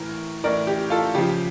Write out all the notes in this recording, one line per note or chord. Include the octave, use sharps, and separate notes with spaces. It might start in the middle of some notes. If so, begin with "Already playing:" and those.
Already playing: A2 E3 A#4
A2 E3 A#4 D5
G4
F4 A4
C#3 F3 G4